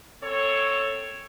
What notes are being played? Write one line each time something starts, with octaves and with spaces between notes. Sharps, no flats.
F#2 C4 A4 C#5